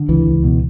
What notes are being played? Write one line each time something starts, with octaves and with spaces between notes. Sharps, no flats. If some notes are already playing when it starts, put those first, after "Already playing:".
Already playing: D3
C#2 E3
C#2
B2